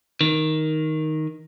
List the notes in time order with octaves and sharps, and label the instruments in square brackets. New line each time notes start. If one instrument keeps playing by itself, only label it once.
[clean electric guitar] D#3